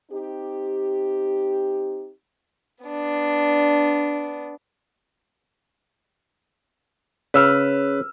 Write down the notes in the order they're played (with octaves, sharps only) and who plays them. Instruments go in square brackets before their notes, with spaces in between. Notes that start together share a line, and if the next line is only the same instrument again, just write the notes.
[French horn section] C4 D#4 G4
[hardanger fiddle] B3 D4
[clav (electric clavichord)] C#3 [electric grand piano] B4 E6 F6